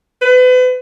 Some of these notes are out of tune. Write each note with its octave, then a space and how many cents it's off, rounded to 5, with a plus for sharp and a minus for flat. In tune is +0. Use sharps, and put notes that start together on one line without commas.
B4 +35